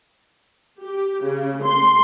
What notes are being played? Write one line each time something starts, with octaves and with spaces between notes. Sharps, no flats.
G4
C#3
C6